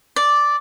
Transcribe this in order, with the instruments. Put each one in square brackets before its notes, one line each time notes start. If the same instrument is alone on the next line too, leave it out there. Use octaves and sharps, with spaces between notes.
[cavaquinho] D5